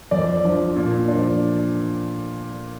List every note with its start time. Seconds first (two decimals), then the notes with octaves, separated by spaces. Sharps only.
0.11 F2 D5
0.44 F3 D4
0.76 A#2
1.08 F3 D4